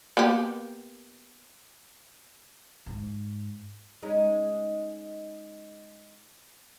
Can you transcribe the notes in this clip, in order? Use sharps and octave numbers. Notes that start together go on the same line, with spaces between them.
A#3 B3 G4
G#2
G#3 C#4 D#4